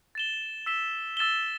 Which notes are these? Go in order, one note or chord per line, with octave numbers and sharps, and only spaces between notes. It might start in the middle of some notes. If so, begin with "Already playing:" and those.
A6 E7 G7
E6 B6 E7 G7
E6 A6 E7 G7